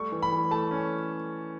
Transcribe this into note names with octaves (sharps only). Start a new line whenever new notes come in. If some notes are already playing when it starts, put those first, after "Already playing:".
Already playing: G3 A3 C#6
E3
B5
E3
A3 A5
C#4